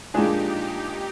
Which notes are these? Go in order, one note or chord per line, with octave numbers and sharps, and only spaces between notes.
A#2 F3 G#3 D4 D#4 G4 G#4
D#4 G4